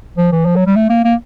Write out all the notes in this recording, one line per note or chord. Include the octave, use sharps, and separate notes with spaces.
F3
E3
F3
F#3
G3
A3
A#3
A#3